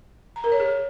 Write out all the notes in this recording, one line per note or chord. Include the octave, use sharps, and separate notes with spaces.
A#5
A#4
C#5
G#4